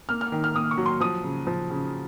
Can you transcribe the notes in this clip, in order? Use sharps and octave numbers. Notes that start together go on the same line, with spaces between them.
A#3 F6
F6
D#3
F6
A#3 D#6
C#6
F#3
C6
F3 D#6
C#3
F3
C#3